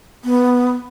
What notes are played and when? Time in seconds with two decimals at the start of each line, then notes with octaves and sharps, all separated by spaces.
0.24 B3